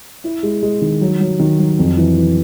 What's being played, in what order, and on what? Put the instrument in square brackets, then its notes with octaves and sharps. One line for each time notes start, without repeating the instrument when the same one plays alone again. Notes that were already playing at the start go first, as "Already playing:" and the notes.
[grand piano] E4
G#3
G#3
D#3
F#3
F#3
D#3
F#3
F2
E3
E3